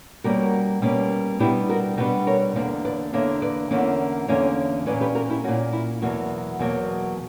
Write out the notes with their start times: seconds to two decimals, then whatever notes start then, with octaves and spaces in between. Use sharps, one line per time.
0.24 B2 G3 A#3 C#4 F#4 A#4
0.82 B2 G3 A#3 C#4
1.39 B2 G3 B3 D4 E4 G4
1.69 F#4 A#4
1.97 B2 G3 B3 D4 G4 B4
2.27 A#4 C#5
2.55 E2 D3 A#3 D4 B4 D5
2.85 B4 D5
3.13 E2 D3 A#3 D4 C#5 E5
3.42 B4 D5
3.71 E2 D3 A#3 C#4
4.28 E2 D3 A#3 C#4 C#5 E5
4.86 A#2 A#3 C#4 B4 D5
5.01 G4 B4
5.15 F#4 A#4
5.30 E4 G4
5.44 A#2 A#3 C#4 F#4
5.72 E4
6.02 E2 B2 F#3 A#3 F#4
6.59 E2 B2 F#3 A#3